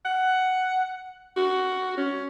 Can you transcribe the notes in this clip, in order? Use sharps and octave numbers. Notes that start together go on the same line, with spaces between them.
F#5
F#4
C#4